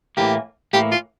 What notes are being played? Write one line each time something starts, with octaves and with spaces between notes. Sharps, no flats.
A2 E3 A#3 G4
A2 E3 A#3 G4
F4